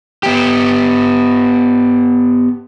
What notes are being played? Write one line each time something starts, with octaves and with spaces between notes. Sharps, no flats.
B3 G4